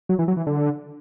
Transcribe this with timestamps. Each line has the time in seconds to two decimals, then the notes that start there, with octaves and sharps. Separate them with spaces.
0.09 F#3
0.19 E3
0.28 F#3
0.37 E3
0.47 D3